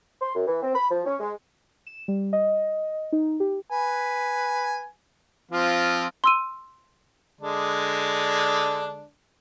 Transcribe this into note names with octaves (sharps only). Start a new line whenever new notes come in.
C6
F#2
E3
C4
B5
F3
C#4
G#3
E7
G3
D#5
D#4
G4
B4 G#5
F3 C4 F4
C6 E6 D#7
D3 G#3 D4